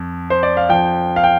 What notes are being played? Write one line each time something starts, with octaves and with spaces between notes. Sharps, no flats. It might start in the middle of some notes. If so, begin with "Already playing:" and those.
Already playing: F2
C5
D5
F5
F2 F3 G5
F5
G5